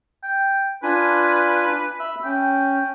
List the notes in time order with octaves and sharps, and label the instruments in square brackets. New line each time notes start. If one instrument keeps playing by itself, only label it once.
[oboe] G5
[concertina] D4 F4 G#5 [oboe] B4
[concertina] E5 B5 E6
[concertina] C#4 [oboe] G5